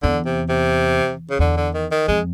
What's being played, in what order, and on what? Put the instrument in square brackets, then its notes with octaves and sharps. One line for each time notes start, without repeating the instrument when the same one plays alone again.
[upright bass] E2 [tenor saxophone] D3
[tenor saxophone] C3
C3
C#3
[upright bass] E2 [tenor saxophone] D3
[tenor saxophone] D3
D#3
D#3
[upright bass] F2 [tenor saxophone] G#3